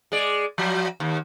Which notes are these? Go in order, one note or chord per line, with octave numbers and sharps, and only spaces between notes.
G#3 D5
F3 F#3
D#2